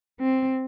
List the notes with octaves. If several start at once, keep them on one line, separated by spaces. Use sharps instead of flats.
C4